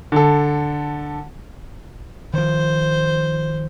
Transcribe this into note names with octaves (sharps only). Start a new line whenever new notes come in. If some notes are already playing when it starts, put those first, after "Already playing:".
D3 A4
D#3 F3 C5